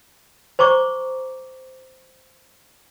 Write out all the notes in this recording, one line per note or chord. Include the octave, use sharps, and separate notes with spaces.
C5 A#5 C#6 D6